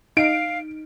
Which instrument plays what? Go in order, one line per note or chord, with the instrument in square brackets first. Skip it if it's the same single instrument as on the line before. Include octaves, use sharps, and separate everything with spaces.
[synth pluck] D#4 [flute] F5 [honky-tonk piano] D7